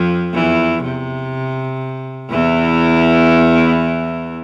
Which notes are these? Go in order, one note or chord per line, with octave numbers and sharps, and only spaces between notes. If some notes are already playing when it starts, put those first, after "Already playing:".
Already playing: F2 F3
E2 E3
C3
E2 E3